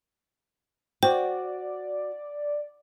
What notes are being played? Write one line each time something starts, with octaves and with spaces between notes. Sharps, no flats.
F#4 C5 D5 G5